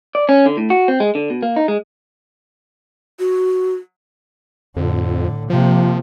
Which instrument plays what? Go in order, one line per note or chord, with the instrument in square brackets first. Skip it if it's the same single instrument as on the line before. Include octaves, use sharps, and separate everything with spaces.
[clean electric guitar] D5
C#4
D3
A2
F#4
C4
G#3
D3
B2
A#3
D#4
G#3
[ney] F#4
[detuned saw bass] F2 [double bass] A2 D3
[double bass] C3 A#3 [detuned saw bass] F3